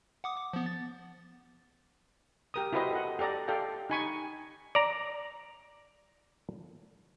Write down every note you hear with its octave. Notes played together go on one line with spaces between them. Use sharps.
F#5 D6 D#6
D6
F3 B3
A6
G4 A#4 D#6
E4 F#4 G4 B4 C5 D#5
A4 D#5 F#5
G4 A4 D5 A#5
G4 A4 D5 F5 G5
D#4 G4 G#5 B5 C#6
D5 A#5